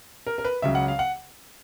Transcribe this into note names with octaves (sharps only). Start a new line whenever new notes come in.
A#4
A#4
B4
C#2 C#3 F#3 E5
F#5
F5
F#5